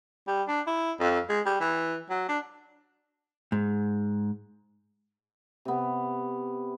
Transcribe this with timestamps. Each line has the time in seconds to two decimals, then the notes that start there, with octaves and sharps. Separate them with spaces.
0.27 G3
0.48 D4
0.67 E4
1.00 F2
1.29 G#3
1.46 G3
1.60 E3
2.10 F#3
2.29 D4
3.52 G#2
5.65 C3 B3